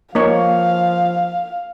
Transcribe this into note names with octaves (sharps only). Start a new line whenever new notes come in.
F3 A#3 D#4 C#5 F5